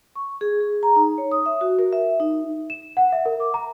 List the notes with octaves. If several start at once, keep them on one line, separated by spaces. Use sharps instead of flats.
C#6
G#4
G#4
A#5
D#4
C#5
D#6
E5
F#4
A#4
E5
D#4
E7
F#5
E5
A#4
D6
A#5